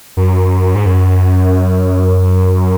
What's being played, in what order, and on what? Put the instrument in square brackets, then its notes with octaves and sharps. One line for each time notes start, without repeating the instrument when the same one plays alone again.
[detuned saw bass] F#2
G#2
F#2